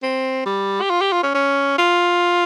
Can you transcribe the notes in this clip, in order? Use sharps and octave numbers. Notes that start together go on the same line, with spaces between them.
C4
G3
G4
F4
G4
F4
C#4
C#4
F4